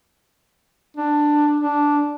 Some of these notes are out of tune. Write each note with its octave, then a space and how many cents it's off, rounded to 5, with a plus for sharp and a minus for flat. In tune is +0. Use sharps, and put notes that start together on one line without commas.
D4 +10
D4 -5